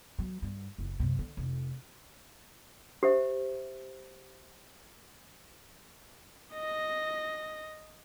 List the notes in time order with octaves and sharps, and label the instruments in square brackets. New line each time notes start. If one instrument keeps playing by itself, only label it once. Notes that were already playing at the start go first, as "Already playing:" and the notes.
[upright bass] F#3
G2
F#1
F#2 C3
D3
F1
[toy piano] G4 C5 E5
[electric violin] D#5 A#6